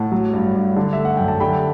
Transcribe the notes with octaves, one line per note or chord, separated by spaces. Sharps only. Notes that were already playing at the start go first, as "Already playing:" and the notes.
Already playing: A2 F#5 A5
F#3
G2
G2
D3
A3 E5
F#5
F#2 G5
A5
D3 G5 B5